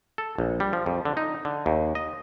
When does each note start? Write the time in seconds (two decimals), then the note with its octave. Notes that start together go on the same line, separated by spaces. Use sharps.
0.18 A4
0.38 A#1
0.60 G3
0.73 F3
0.86 F2
1.05 D3
1.17 D#4
1.45 D3
1.66 D#2
1.95 D#5